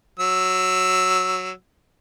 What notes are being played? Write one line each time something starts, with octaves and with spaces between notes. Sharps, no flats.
F#3 E6